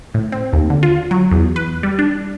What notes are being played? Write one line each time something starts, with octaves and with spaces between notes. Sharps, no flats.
A2
C4
D#2
D3
F4
F#3
E2
B4
G3
D4